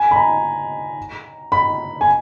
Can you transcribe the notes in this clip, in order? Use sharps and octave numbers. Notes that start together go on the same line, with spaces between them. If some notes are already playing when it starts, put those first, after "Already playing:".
Already playing: G#5
B5
A#5
B5
G#5